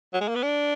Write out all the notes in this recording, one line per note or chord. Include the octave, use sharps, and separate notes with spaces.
F#3
G#3
A#3
B3
D4